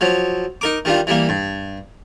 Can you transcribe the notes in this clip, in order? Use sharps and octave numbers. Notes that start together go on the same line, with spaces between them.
F3 F#3
D#4 A#4 D6
D#3 G3 D4 F4
E3 G3 A#3
G2